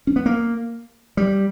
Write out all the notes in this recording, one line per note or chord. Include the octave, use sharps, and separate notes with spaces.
C#4
B3
A#3
G3